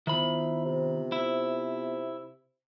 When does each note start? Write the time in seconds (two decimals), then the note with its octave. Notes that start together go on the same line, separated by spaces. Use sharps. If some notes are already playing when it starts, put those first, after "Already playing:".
0.07 D#3 B3 E4 F4 C5 B5
0.65 C3
1.12 E4